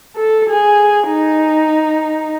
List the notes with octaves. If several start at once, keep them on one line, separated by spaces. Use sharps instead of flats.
A4
G#4
D#4